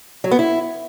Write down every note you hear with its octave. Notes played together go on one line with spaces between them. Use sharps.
F#3
B3
E4